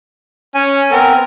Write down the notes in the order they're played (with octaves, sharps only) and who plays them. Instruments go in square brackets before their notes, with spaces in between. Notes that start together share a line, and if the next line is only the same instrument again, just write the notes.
[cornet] C#4 [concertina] G#5
[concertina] B3 C4 [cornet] A#4